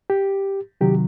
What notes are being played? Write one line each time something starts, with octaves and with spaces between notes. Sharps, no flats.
G4
C3 D#3 F#3 G4